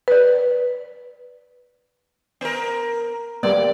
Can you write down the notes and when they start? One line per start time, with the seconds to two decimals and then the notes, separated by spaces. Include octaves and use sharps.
0.08 B4 D5
2.41 B3 A#4
3.43 G3 A#3 B3 D5